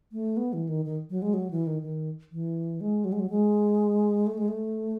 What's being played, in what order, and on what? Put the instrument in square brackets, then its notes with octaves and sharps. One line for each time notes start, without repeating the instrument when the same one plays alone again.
[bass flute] A3
B3
E3
D#3
D#3
F#3
G#3
F#3
E3
D#3
D#3
E3
G#3
F#3
G#3
F#3
G#3
A3
G#3
A3